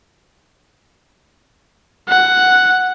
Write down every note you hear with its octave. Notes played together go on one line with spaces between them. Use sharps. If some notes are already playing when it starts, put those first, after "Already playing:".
F#5